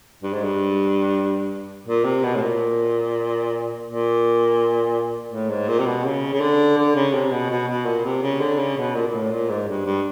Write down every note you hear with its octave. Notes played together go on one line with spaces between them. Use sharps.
G2
G#2
G2
A#2
C3
B2
A2
A#2
A#2
A2
G#2
A#2
C3
B2
C#3
C#3
D3
D3
C#3
C3
B2
B2
B2
A#2
C3
C#3
D3
C#3
B2
A#2
A#2
A2
A#2
G#2
G2
G2